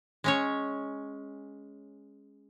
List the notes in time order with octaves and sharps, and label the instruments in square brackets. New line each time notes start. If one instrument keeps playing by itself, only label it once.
[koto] G#3 C#4 C#5